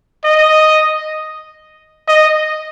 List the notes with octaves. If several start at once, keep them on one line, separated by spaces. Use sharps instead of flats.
D#5
D#5